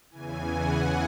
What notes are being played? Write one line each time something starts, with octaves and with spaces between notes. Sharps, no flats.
E2 C#3 E3 G#5
F#5